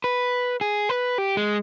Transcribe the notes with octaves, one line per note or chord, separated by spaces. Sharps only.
B4
G#4
B4
G4
G#3